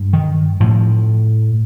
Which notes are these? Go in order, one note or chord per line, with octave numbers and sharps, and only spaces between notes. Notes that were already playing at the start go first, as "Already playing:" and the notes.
Already playing: G2
D#3
A2 F3